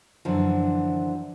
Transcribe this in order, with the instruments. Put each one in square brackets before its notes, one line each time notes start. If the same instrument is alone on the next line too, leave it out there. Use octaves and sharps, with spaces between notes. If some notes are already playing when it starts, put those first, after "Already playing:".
[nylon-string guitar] F#2 D3 E3 F3